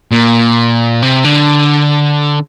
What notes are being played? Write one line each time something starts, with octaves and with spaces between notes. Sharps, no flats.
A#2
C3
D3